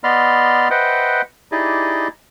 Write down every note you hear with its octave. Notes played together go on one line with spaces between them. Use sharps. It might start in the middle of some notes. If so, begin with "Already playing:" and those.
B3 D5 D#5 B5 C6 F6
B4 C5 D#5 E5 F#5 G5
D#4 E4 G4 G#4 D5 D#5